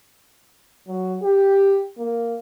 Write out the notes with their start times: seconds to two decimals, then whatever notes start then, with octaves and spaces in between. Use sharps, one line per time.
0.88 F#3
1.23 G4
1.98 A#3